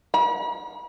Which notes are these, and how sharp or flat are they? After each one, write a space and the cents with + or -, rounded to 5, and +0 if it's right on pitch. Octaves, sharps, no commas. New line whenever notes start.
B5 -45